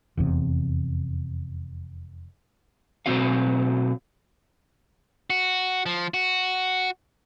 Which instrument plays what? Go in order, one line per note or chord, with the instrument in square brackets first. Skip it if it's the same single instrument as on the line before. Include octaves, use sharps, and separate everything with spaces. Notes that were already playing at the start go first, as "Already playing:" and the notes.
[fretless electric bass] F1 E2 C3
[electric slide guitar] B2 F#3 A3 C4 F#4 F5
[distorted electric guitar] F#4
F3
F#4